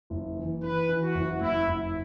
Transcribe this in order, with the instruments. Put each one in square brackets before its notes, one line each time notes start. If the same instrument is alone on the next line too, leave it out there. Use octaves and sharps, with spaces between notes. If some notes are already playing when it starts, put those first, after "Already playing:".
[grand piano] F#1
E3
[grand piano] E3 [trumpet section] B4
[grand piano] E3
[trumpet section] F#4
[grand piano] F#1
[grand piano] F#1 [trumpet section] E4
[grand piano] F#1